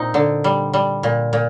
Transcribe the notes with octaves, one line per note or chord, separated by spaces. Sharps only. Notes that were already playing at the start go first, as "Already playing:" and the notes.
Already playing: A#2 C4 D#4
D3
G3
G3
A#2
A#2